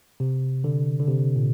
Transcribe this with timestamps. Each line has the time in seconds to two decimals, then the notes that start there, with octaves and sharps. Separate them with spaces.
0.20 C3
0.64 D3
0.99 D3
1.08 C3
1.36 A#2